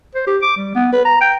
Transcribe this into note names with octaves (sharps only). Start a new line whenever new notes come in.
C5
G4
D6
G3
B3
B4
A#5
G5